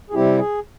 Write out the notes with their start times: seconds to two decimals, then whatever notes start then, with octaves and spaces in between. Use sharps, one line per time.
0.10 G#4
0.13 C3 G3 C4 E4 G4
0.39 G#4